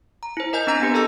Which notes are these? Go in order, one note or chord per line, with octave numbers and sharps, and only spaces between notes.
A#5
E4 C5
A#4 D#5 G#5 G6
C4 D4 A#5 G6 A#6
B3 D4 G4 B4
G#4 A4 D#5 G#5 A5 E6